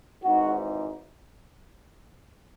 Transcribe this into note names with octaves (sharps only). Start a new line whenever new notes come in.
G#1 G#2 E3 D#4 F#4